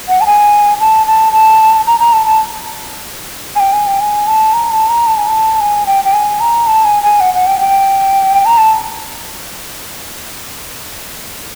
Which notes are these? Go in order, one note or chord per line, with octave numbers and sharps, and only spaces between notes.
F#5
A5
G#5
A5
A5
A5
A#5
A#5
A5
A5
G#5
G5
G#5
G5
G#5
A5
A#5
A5
A#5
A5
G#5
A5
G#5
G5
G5
G#5
A#5
A5
G#5
G#5
F#5
F#5
G5
G5
A#5
A5